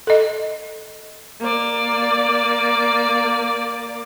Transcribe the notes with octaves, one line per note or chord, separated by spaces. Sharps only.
A4 D#5
A#3 D5